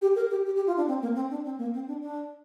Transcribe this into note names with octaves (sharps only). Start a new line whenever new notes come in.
G4
A#4
G4
G4
G4
F4
D4
C4
A#3
C4
D4
C4
A#3
C4
D4
D4